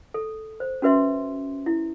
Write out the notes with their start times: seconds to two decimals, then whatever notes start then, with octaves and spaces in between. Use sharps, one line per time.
0.14 A4
0.60 C5
0.82 C#4 F#4 B4 E5 C6
1.66 E4